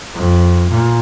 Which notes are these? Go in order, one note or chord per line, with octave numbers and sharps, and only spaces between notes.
F2
A#2